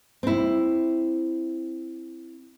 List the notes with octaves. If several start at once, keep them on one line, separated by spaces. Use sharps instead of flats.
C4 E4